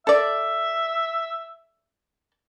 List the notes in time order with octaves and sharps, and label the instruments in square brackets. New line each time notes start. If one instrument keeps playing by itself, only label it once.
[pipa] A4 D5 [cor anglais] E5